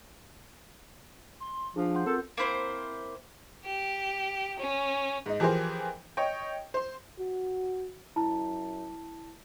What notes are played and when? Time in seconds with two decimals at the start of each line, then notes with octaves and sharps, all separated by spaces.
1.40 C6
1.76 F3 D4 G#4
1.95 F#5 C6 G6
2.06 C4 F4 A4 A#4 G6
2.37 A#3 C4 E4 C5
3.65 G4
4.59 C#4
5.26 G#2 D#4
5.40 E3 F3 G4 G#4 A#4 C5
6.17 C#5 D#5 G5
6.74 C5 C6
7.19 F#4
8.16 F#2 E4 A5